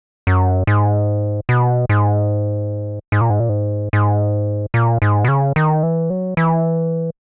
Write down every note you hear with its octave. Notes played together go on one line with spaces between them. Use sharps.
F#2
G#2
B2
G#2
G#2
A#2
G#2
A#2
G#2
G#2
A#2
G#2
B2
C#3
D#3
E3
F#3
E3